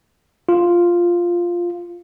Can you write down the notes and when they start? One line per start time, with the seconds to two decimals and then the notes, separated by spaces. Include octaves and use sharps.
0.49 F4